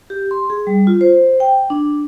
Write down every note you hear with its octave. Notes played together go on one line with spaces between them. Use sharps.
G4
C6
G#4
G3
F4
C5
G5
D4